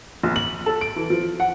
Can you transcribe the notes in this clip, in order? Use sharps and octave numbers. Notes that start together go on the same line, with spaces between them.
A#1
F#7
A4
D7
E3
F3
F#5